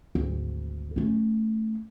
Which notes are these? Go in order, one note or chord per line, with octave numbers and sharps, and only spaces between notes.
G#1 D2
A3 C#4